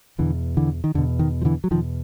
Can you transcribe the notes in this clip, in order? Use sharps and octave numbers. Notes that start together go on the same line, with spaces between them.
E2 B2 D3 E3
D3 E3
D#3
E2 B2 D3
D#3
F3
D3 E3
F#3
E2 B2 D#3 F3